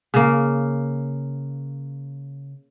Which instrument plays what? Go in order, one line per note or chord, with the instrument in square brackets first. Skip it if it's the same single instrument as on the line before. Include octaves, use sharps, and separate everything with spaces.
[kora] C#3 A#3